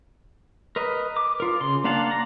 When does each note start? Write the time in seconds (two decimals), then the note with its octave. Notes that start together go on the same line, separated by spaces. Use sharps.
0.76 A#4 B4 D#5
1.17 D6
1.40 F4 A#4
1.61 C#3 C6
1.84 A#3 D4 F5 F#5 A5
2.11 A#5